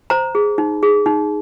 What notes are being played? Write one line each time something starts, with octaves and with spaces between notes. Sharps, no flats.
C5 A#5
G#4
D#4
G#4
D#4